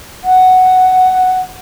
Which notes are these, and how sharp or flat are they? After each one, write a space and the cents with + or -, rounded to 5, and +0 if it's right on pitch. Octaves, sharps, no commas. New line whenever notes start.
F#5 +5